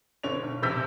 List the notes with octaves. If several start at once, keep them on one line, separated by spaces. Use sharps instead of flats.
F#1 D3 C#5 F7
B1
F1 A#1 C3 E6 G6 B6